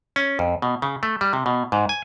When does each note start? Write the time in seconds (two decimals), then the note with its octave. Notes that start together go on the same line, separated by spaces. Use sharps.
0.16 C#4
0.39 F2
0.62 B2
0.82 C#3
1.03 A3
1.21 G3
1.33 C3
1.46 B2
1.72 G#2
1.89 G#5